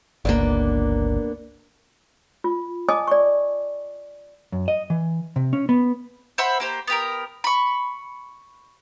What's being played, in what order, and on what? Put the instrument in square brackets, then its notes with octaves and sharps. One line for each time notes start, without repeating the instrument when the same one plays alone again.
[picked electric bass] G1 C#2 [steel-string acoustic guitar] A#3 B3 D4
[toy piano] F4
D#5 G#5 A5 D6 D#6
D5 C#6
[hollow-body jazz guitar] F#2
D#5
E3
C3
C#4
B3
[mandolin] C5 E5 F#5 B5
A#3 G4 C5
B3 G4 A#4
B5 C#6